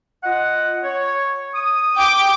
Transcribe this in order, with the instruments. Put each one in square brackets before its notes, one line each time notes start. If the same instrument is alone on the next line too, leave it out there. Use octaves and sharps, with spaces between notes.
[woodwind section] F4 D#5 F#5
C#5
D#6
[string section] G5 D6